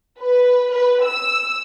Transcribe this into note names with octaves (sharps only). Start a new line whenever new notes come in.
B4
B4
E6